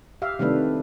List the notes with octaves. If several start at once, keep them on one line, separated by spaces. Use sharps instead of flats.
G4 E5 F5
C3 D#3 G3 A3 D4 B4